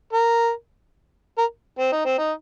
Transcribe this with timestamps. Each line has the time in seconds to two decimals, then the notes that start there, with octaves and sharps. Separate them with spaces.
0.13 A#4
1.38 A#4
1.79 C4
1.92 D#4
2.05 C4
2.19 D#4